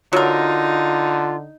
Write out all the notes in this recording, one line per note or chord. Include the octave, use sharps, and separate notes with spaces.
D3 F#3 D#4 F4 A#4